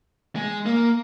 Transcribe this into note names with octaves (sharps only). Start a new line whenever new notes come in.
G#3
A#3